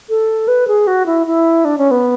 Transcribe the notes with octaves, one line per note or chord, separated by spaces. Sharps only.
A4
B4
G#4
F#4
E4
E4
D4
C#4
B3